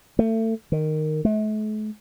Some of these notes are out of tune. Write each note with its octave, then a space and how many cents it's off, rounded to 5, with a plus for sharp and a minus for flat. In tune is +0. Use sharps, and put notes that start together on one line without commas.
A3 +30
D#3 -10
A3 -45